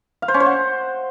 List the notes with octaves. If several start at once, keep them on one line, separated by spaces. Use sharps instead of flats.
F5
C5
C#4
C5
F#5